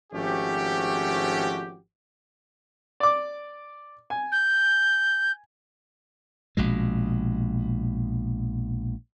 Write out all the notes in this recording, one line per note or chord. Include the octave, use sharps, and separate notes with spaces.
G#1 F3 A3 C#4 F#4 G4
D5 D6
G#5
G6
A#1 B2 G#3